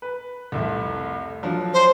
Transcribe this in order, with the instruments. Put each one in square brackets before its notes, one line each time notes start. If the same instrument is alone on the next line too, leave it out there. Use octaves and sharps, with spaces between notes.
[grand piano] B4
C2 F2 A3
F3 F#3 D4
[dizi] C5